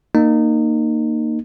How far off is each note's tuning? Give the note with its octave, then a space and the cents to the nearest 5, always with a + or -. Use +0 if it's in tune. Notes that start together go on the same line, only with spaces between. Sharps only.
A#3 -15 D#4 -25